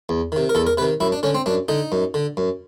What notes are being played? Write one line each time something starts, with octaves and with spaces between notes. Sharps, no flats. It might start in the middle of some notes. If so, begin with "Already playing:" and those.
E2
C3 D#3
A#4
E2 A4
A#4
C3 D#3 B4
F#2 E4
D4
D3 C#4
C4
F#2 D4
D3 D#4
F#2
D3
F#2